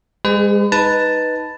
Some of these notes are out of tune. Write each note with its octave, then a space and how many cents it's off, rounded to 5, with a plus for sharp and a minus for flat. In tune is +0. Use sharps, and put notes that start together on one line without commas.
G#3 -35 G#4 +5 B4 +45
D#4 +0 B4 +0 A5 +5